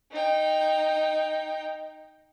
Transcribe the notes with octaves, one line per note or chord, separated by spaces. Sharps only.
D#4 G5